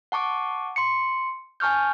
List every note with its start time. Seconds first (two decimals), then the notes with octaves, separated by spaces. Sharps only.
0.12 F#5 A5 C#6 D6
0.76 C6 C#7
1.60 G#5 A5 C#6 F6 G6